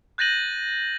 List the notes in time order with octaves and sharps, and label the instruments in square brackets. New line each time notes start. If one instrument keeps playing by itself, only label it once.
[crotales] F#6 G6 A6 A#6 D#7 F#7